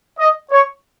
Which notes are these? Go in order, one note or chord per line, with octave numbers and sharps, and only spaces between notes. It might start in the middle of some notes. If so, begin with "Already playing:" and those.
D#5
C#5